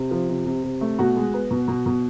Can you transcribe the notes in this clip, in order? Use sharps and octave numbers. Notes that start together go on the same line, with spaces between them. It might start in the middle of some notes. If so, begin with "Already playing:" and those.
Already playing: C3
F3
C3
C3
C3
A3
B2 F#4
G#3
B3
B2
B2
B2